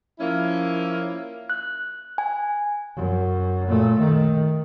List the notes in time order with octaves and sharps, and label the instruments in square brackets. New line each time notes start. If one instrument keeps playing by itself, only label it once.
[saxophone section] F3 A#3 C#4 E4
[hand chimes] F#6
G#5
[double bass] F#2
A#2 A3
D#3